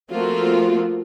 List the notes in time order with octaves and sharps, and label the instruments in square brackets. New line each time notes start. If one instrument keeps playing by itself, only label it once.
[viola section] F3 A3 A#3 C4 F4 F#4